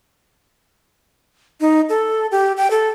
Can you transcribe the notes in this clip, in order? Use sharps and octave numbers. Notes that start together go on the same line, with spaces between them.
D#4
A4
G4
G5
A4